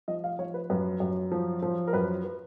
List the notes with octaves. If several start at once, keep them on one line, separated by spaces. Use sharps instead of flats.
F3 D#5
F5
F3 C#5
B4
F#2 B4
F#2
F3
F3
A#4
F#2 B4
B4